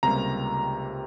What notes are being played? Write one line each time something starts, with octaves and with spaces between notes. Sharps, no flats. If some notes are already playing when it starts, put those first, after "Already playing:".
C#2 C3 G3 A#3 A#5